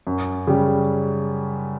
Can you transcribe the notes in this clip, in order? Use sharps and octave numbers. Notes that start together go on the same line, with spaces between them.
F#2
C#3 G3